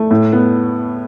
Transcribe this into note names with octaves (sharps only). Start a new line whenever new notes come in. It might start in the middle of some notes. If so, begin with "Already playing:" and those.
Already playing: A3
A2
B3